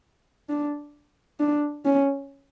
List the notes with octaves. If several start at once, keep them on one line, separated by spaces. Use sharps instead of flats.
D4
D4
C#4